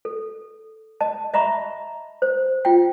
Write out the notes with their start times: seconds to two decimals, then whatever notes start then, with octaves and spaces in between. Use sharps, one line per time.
0.05 A4
1.01 D#5 A5
1.34 D#5 E5 A#5 B5 C#6
2.22 C5
2.65 F4 G5